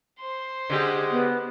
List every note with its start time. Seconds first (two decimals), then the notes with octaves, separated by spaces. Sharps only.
0.19 C5 C6
0.70 D3 G#3 G4
1.12 B3